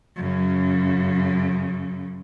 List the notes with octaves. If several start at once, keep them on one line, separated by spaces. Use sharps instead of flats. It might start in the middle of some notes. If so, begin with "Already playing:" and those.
F#2 C#3